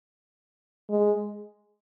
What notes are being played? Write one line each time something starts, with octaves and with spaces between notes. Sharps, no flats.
G#3